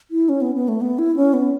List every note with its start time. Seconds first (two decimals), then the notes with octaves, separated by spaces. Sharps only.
0.11 E4
0.29 C#4
0.41 B3
0.55 B3
0.68 A3
0.81 B3
0.98 E4
1.16 C#4
1.33 B3